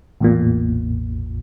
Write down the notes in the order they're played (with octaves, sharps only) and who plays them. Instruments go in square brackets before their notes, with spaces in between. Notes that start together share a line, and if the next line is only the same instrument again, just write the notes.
[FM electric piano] A1 E2 A#2